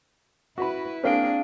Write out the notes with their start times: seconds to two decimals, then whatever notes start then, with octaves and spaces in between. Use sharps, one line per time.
0.58 E4 F#4 B4 B5
1.04 A#3 C4 D4 G#4 A#4 C5 F5 D7